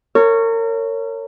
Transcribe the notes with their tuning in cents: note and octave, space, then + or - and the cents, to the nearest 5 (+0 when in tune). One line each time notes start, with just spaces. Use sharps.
A#4 -35 C#5 +0